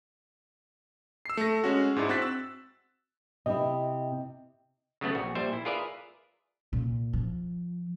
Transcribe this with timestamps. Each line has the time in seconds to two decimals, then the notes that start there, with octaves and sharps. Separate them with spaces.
1.26 E6 C7
1.37 A3 A#6
1.64 G#3 C#4 F#4
1.96 G#2 G#3 D4 E4
2.09 C4 F#4 F#6 A6 B6
2.22 E6
3.46 C3 E4 D#5
5.01 C#3 F#3 A3 B3
5.15 A#1 F#4
5.35 A#2 G3 C5 E5
5.53 E4
5.65 F4 G#4 A#4 B4 D5 E5
6.73 A#2
7.13 F3